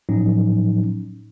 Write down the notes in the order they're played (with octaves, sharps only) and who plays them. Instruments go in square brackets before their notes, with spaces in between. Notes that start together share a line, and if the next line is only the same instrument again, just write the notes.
[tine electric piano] A2 F3 F#3 C#4 D#4